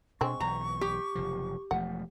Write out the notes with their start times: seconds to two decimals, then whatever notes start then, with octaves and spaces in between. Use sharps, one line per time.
0.21 B2 G#3 C4 D4 C#6
0.40 B1 E3 A#5
0.81 G4
1.15 F#1 C3 F3
1.71 E1 F3 A3 F#5